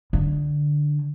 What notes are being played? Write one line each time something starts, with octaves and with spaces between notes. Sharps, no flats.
D3